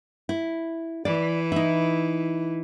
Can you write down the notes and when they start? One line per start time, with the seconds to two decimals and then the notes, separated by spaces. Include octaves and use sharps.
0.29 E4
1.05 E3 D5
1.52 D#4 E4